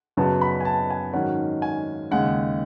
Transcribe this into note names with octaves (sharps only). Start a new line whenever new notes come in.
F#2 C#3 F#3 B3 A5
B5
G#5
A5
G#5
G#2 D#3 F#3 C#4 F#5
G#5
D#2 C#3 G#3 F#5